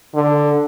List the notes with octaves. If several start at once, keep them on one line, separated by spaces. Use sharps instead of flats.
D3